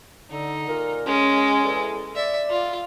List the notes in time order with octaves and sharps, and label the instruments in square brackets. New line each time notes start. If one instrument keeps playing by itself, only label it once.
[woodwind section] D3 [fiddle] D#4
[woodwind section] A#2 A#4
[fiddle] G#3 [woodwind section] C#4
[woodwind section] E2 A4
[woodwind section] D5 [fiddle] E5
[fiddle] F4